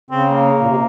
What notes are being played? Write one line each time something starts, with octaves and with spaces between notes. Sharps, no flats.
C#3 C4
A#3
A#2
C3